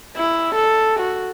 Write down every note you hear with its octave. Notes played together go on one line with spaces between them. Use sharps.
E4
A4
F#4